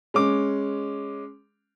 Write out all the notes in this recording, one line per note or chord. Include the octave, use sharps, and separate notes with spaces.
G#3 C#4 D6